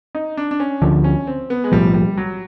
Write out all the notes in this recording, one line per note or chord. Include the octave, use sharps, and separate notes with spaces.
D#4
D4
D4
C#4
D2 D3 F3
C#4
C4
B3
G#3
B1 A2 F3 G3
G3
F#3